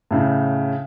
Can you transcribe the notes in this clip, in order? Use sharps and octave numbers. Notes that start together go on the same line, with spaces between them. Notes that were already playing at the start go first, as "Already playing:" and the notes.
A2 C#3